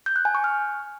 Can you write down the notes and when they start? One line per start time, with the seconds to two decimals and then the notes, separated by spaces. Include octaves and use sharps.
0.06 G6
0.16 F#6
0.25 G#5
0.35 C#6
0.44 F6